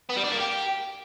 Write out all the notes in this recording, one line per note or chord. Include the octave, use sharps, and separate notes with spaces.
B3
G3
D4
A#3
G4